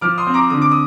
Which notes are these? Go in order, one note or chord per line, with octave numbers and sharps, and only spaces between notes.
F3 D6 F6
C6 D#6
C4
A#5 D6
D3 D#6
D6
D#6